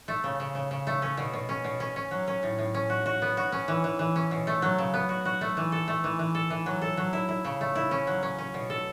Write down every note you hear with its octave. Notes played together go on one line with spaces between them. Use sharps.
A3
C#3
C#3
C#3
C#3
A3
C#4
B2
B2
C#4
B2
C#4
C#4
F#3
C#4
A2
A2
C#4
F#4
F#4
B3
F#4
C#4
E3
E3
E3
C#4
B2
A3
F#3
C#3
B3
F#4
F#4
A3
E3
A4
A3
E3
E3
A4
E3
F#3
A4
F#3
E4
E4
C#3
A3
E4
C#4
F#3
C#4
C#4
B2
A4